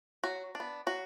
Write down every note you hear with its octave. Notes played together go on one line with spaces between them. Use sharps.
F#3 F#4
D4
B3
F#3 F#4